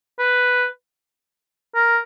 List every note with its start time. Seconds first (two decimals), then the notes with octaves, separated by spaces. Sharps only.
0.19 B4
1.75 A#4